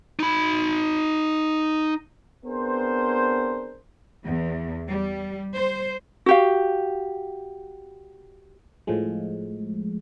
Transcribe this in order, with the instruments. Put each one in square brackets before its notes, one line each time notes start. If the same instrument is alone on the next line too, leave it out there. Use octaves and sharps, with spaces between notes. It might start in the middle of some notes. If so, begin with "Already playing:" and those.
[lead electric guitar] D#4 B5
[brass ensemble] B3 C4 D4 G#4 A#4 C5
[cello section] E2
G3
C5
[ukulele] F#4 G4 F5
[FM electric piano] A2 F3 G#3